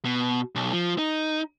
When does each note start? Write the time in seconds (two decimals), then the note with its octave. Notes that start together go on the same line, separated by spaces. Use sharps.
0.05 B2
0.55 B1
0.73 F3
0.98 D#4